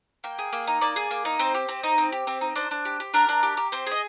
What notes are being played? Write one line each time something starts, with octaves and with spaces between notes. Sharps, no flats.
A#3 G5
G#4
A#3
D#4
A#3 D5
G#4
A#3
D#4
C4 C5
G4
C4
D#4
C4
G4
C4
D#4
D4 C5
D4
G4
G4
D4 A#4
D4
G4
G4
C4 C5
G#4 D#5